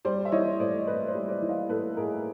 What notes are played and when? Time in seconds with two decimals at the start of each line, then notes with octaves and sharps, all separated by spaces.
0.05 G3 C5 D5
0.25 E5
0.32 E3 C#5 D#5
0.60 A2 C5 D5
0.87 A2 B4 C#5
1.07 C5 D5
1.15 G3
1.28 C5 D5
1.42 E3
1.49 D#5 F5
1.69 A2 A4 B4
1.97 A2 G#4 A#4